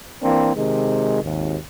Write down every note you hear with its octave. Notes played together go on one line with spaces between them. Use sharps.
E3 A#3 C4 D4
C3 D#3 G#3
G#1 D#2